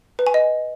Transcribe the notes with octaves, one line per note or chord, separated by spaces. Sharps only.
B4
G#5
D#5